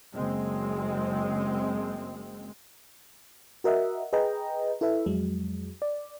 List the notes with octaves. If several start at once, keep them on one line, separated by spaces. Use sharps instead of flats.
F#1 G#3 C4
F#4 A#4 D#5 E5 F#5
G#4 B4 D#5 G5 A#5
E4 A4 B4 E5
F2 F#3 G#3
D5